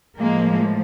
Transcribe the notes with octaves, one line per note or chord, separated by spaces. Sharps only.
A2 F3 G#3 A#3